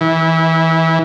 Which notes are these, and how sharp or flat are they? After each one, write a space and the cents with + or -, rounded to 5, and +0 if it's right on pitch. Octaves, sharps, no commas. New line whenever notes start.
E3 -20